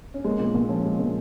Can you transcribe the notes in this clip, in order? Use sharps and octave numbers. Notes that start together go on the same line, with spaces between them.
C#4
G#3 A#3
A#2
A#2
F3 C#4
G#3
A#2